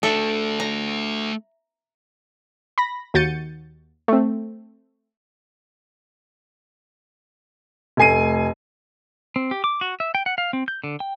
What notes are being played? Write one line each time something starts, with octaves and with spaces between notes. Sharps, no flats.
A3 D4 A4 E5
A#5
B5 A#6
D#2 F#4 G6 A6 C#7 D#7
A3 C4
F1 A3 G#5 C7 D#7
C4
G4
D6
F#4
E5
G5
F#5
F5
C4
G6
D3
G5